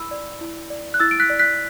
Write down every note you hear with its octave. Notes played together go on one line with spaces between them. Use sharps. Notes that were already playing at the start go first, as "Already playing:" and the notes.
Already playing: E4 B5 E6
D5
E4
D5
F#6
E4 E6 A6
D7
F#6 B6
D5
F#6 B6